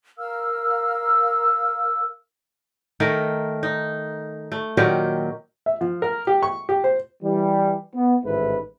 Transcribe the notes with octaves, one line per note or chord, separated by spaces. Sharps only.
A#4 F5 E6 F6
D#3 A3 A#4
D#4
A3
A#2 D#3 F#3 G4
E5
F3
A#4
G4
C#6
G4
C5
E3 G3
B3
A1 G#2 D#3 E4 B4